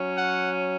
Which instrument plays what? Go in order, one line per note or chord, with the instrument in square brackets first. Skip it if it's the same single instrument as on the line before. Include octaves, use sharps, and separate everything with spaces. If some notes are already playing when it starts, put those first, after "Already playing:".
Already playing: [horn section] F#3 C#4
F#5